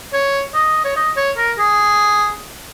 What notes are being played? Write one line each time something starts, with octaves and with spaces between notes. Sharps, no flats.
C#5
D#5
C#5
D#5
C#5
A#4
G#4